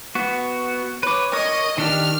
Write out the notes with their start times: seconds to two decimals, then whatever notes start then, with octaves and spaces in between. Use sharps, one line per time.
0.15 B3 F#4
1.03 B4 C#5 D6
1.33 A#4 C#5 D#5 D#6
1.78 D#3 D4 G4 F6